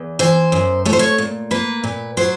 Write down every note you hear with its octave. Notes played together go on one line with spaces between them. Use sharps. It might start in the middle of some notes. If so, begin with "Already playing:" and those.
Already playing: E2
E3 C5
F#2
A3 C#5
C5
C#5
A#2
A#3 B4
A#2
F#3 C5